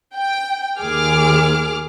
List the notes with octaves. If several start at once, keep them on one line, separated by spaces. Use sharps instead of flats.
G5
D#2 G#4 D6 F6